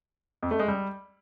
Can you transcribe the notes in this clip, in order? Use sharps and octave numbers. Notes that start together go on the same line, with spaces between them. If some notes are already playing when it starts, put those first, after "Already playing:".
F2
A3
G#3
G3